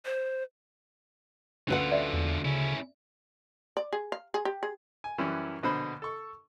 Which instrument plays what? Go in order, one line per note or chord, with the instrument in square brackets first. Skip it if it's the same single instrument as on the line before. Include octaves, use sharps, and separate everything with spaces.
[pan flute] C5
[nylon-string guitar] D2 B4 F#5 [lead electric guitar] D3 F4 [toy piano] C#4 E6
[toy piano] D5 E5
[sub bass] E2
[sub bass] C#3 [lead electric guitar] C#4 E4
[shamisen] D5
G#4
F5
G#4
G4
G#4
[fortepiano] G#5
F#2 E3 F#3 G3 C#4 E4
A#1 B2 D3 C5 B5
A4 C#6